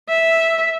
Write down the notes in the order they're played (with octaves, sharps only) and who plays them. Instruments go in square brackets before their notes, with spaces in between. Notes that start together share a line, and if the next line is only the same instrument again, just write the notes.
[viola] E5